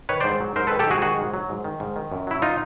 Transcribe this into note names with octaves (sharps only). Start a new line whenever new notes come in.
D#3 B4 C#5
G#2 C5 D5
F#3
G#2 A#4 C5
D#3 A4 B4
G4 A4
G#2 F#4 G#4
D#3 F#4 G#4
G#2
F#3
G#2
D#3
G#2
D#3
F#2
F#3 E4
D#4 F4